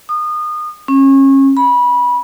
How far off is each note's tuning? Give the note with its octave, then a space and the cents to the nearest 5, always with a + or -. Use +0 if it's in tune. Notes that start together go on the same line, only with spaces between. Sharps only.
D#6 -30
C#4 -30
B5 -20